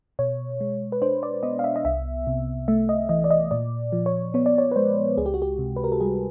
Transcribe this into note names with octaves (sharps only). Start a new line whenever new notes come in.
B2 C#5
G#3
B4
D4 C5
D5
B3 D#5
F5
E5
D#5
C2 E5
C3
A3 E5
D#5
E3 D#5
D5
D#5
A#2 D5
F3
C#5
B3 C#5
D5
C#5
B4
G#3 C5
C#2 G#4
G4
F#4
G4
C3
B4
A#4
A4
G3 G#4